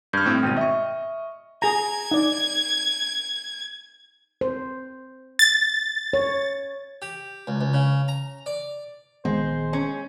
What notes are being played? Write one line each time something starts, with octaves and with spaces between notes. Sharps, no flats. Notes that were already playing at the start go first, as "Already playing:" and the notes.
G2 F6 G6 G#6
A2 C4
G#1 B2 G5 D#7
D#5 E5 C#6
G#4 A#5 G#6
D#4 D5
C5
A6
C#5
G4
C#2
C#2
C#3
A#5
D5
A#1 D#3 G#3 B3 C5
C#4